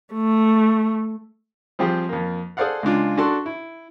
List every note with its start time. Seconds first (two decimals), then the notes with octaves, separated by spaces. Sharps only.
0.13 A3
1.79 F3 G3 C4 G4 G#4
2.09 F2 A#3
2.57 G#4 A4 C5 D5 F5 F#5
2.83 C#2 G#3 D4 F4
3.17 D4 F#4 A4 A5 C6
3.46 E4